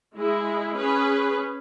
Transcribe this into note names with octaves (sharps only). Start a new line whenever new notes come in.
G#3 E4 G#4
C#4 G#4 B4